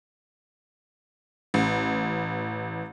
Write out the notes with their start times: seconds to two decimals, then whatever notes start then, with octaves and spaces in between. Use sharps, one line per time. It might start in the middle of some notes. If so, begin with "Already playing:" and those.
1.54 A1